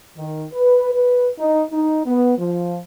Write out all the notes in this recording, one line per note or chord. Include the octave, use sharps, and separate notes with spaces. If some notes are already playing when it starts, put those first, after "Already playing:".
D#3
B4
B4
D#4
D#4
B3
F3